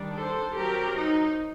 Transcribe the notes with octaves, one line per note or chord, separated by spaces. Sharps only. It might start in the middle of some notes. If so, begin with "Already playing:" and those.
Already playing: D#3 G3 D4
A4 C5
F#3 C4 G4 A#4
D#4